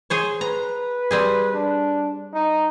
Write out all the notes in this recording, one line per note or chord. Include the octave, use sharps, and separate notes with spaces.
G#4 C5 C#5
B4 A#5
G3 C4 G#4
D4
D#4